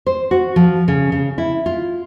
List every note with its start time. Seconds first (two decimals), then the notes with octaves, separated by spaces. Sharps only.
0.06 C5
0.31 F#4
0.56 F3
0.88 C#3
1.12 C#3
1.38 E4
1.66 F4